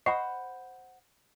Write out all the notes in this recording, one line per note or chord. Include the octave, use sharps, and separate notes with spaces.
C5 D#5 F#5 B5 C#6 C7